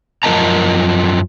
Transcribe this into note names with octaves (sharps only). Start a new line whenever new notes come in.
F#2 F3 A#4 D#5 A5 A#5